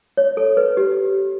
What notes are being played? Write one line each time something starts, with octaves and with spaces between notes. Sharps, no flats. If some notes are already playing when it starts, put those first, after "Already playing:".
C#5
A4
B4
G4